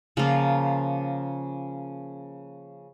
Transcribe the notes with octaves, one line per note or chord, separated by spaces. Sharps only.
C#3 F3 A#3 F4